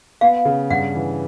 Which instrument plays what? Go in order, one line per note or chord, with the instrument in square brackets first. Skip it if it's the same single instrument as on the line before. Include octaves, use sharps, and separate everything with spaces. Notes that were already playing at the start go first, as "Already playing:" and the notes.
[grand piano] B3 [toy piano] F5
[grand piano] C#3
[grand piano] G2 [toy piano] F#5
[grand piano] E3